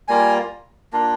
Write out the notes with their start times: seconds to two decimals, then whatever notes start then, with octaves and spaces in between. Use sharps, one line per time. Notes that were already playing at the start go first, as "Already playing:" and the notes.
0.08 G3 A#3 F4 G#5
0.93 A#3 D4 F4